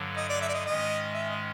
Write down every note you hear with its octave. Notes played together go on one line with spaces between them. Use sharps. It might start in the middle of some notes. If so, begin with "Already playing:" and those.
Already playing: G2 D3 F#3
D#5
D5
E5
D5
D#5
G#2 D#3 G#3 C#4 D#5
E5
D#5